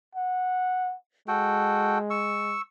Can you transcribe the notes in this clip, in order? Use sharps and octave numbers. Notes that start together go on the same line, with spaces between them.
F#5
G#3 F#4 A4 G5
C#6 E6